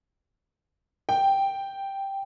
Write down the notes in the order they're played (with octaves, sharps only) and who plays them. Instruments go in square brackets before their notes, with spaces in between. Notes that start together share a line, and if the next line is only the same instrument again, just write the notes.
[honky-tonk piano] G5